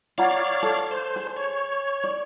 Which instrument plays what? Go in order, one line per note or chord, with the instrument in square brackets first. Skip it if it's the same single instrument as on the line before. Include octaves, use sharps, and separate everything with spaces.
[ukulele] F4 F#5 A#5 [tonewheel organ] C#5 D5 F5
[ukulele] A4
[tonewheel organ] C5
[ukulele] G#4
[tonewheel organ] C#5
[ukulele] D5